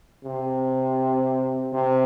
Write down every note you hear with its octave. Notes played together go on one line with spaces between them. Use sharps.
C3
C3